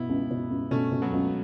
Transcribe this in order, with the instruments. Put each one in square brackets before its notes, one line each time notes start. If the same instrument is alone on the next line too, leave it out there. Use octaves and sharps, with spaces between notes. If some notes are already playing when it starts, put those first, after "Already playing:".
Already playing: [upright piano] B2 [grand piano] B3 E4
[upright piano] C#2
B2
C#2
[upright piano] B2 [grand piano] A3 C#4
[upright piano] B2
[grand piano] F#3 B3
[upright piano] C#2